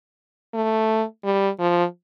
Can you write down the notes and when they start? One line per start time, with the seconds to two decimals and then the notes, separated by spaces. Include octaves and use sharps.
0.54 A3
1.25 G3
1.59 F3